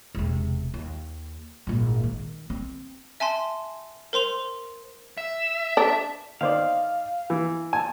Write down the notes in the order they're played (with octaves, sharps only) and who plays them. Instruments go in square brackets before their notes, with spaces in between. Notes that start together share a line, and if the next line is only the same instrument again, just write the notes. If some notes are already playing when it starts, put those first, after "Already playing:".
[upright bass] E1 C3
D#2
G#1 A#2
D#3
C4
[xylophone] E5 G#5 A5 C6
A#4 C5 C6 F7
[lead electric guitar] E5
[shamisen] D4
[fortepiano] D#3 C5 D5 [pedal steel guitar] F5
[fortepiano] E3
G#5 A5